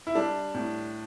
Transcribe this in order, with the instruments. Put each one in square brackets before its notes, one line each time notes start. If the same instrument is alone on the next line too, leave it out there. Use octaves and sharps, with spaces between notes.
[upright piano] E4
G3 D4
A2